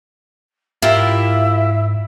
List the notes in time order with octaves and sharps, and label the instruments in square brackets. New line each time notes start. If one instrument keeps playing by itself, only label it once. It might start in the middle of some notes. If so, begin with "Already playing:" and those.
[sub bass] G#2 [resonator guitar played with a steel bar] A#3 F4 G4 [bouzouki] E4 [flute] E5